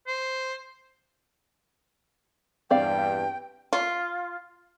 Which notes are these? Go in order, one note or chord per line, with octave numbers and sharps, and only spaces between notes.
C5
E2 G2 C4 D5 F5 G5
F4